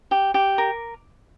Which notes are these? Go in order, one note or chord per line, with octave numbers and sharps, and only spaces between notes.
G4
G4
A#4